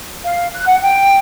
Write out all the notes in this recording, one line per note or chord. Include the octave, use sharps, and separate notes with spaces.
F5
F#6
F#5
G5